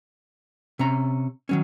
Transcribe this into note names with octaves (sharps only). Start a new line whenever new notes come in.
C3 C#4 A#5
D#3 F#3 C#4